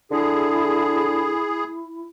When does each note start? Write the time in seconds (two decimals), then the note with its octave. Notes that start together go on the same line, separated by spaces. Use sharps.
0.11 D3 E4 G#4